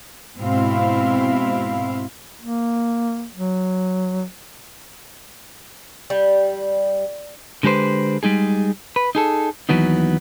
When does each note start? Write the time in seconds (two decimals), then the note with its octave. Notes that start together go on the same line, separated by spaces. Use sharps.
0.38 G#2 B2 C4 E4 F5
2.41 A#3
3.35 F#3
6.10 G3
7.63 D3 G#3 G4 B4 C5
8.23 G3 G#3 D#4 G#4
8.96 B4
9.15 D#4 G#4 A4
9.69 D#2 A2 E3 F#3 B3 D#4